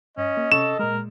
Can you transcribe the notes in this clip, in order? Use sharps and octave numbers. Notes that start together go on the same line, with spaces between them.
G2 C#4 D#5
A#3
C3 C#4 A4 C#6 E7
A#2 G#3 A#4